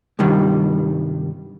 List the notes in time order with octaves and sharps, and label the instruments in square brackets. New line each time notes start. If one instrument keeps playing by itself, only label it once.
[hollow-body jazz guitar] C2 G2 D#3 G3